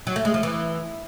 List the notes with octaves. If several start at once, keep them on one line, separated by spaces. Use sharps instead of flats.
F#3
A3
G#3
F3
E3